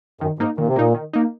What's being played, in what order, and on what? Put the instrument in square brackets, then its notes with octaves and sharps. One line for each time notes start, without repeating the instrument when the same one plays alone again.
[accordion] F#2 [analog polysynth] D#3
[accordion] G#2 [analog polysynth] A#3 D#4
[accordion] A#2 [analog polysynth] D#3
[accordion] C3
[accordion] A#2 [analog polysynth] A#3 D#4
[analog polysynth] D#3
A#3 D#4